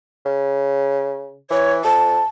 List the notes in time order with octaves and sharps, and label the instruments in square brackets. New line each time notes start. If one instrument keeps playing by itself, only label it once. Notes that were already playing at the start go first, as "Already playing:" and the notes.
[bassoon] C#3
[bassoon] E3 [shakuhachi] C#5
[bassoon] F2 [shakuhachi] A5